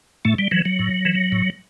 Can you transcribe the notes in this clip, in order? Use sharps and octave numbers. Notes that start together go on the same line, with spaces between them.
A2 A3
G3
E3 F#3
F#3
A2
E3
A2